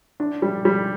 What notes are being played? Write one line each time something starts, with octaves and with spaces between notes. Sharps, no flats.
D4
G3
G3